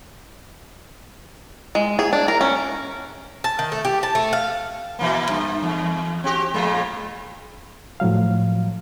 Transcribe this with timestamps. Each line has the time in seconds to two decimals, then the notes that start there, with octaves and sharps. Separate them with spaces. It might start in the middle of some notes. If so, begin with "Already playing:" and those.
1.75 G#3
1.99 G#4
2.13 D4
2.28 A#4
2.41 C#4
3.44 A5
3.59 D#3
3.72 A3
3.85 G4
4.03 A5
4.15 A3
4.33 F5
4.99 A#2 E3 A#3
5.29 G2
5.62 E2
6.24 C4 F#4 G4
6.54 F2 A#2 G#3
8.00 A2 F3 F#3 F5